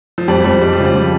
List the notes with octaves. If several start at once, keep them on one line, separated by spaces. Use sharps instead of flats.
F3
F2 G3
F2 G3
G3 G#3
F3
C#3
G3
F3